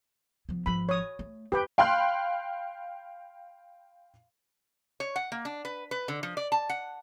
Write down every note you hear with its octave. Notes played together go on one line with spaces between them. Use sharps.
F3 B3
G#1 F3 B5
C#5 D#6
A3
F2 G4 B4 G5
F5 G5 B5 C6 F6 F#6
C#5
F#5
A#3
D4
B4
B4
D3
F3
D5
A5
F#5